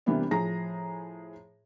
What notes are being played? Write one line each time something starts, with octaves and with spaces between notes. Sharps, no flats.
C3 E3 G3 A#3 B3 D4
A2 F3 G#4 A#5 A#6